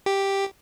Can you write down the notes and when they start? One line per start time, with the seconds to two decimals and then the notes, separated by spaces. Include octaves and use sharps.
0.06 G4